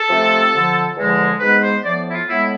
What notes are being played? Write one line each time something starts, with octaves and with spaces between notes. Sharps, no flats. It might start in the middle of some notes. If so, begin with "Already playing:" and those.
Already playing: A4
C3 F3 A3 C4
F2 D3 F3
E2 D3 F3 G#3
G#2 G#3 B3 B4
C5
A2 F3 B3 D5
E4
F4
A2 G#3 B3 E4